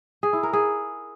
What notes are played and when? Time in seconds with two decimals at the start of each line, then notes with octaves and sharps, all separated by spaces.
0.23 G#4
0.33 E4
0.43 A#4
0.53 G#4